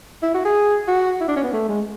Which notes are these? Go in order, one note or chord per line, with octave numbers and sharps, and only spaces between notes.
E4
F#4
G#4
F#4
E4
D4
C#4
B3
A3
G#3